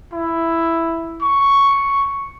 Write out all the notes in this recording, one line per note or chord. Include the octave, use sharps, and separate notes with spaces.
E4
C#6